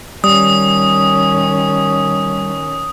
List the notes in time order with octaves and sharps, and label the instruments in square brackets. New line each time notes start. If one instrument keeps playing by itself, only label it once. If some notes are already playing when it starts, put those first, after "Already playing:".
[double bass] D#3 C#4 [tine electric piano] G3 [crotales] D#6